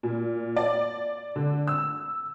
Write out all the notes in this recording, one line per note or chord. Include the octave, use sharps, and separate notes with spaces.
A#2
D5
D3
E6